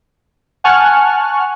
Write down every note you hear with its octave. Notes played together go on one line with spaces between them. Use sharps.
F#5 G#5 A5 C#6 F6 F#6